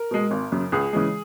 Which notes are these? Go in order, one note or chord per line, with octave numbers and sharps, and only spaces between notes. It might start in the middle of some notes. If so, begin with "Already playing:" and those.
Already playing: A#4
B2 G#3
G#1
F#2 C#3
C#2 G#4
C#3 E3 G#3